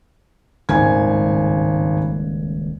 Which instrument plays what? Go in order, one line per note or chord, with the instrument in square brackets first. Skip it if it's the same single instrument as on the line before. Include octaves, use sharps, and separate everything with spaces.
[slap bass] D#1 C#2 A2 [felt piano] G#1 G#5 G#6